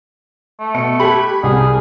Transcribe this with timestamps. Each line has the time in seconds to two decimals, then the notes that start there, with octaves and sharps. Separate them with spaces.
0.60 A3
0.75 B2 C#7
1.00 G4 A4 B5 F#6 G#6
1.43 C2 G#4